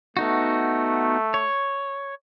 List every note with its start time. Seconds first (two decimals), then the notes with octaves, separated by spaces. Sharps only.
0.17 A3 B3 D#4 F#4
1.34 C#5